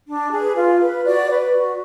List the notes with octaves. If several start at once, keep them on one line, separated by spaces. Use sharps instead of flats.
D4
G#4 B4
F4
B4
F#4 D5
B4
F#4